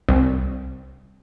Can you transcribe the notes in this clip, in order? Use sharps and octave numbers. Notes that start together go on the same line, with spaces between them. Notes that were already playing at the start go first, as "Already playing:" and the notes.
C2